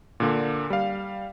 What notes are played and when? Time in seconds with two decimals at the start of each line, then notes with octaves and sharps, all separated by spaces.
0.20 A#2 D3 A#3
0.70 G3 F5